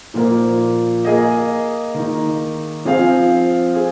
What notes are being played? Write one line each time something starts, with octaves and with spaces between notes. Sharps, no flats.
A#2 F3 A#3
A#3 G#4 D#5
D#3 A#3 D#4
F3 C4 G#4 F5
F4 G#4